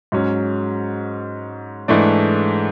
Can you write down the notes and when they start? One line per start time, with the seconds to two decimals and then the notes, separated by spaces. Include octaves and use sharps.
0.12 G#2 F#3 C#4
1.88 G#2 E3 A3 D4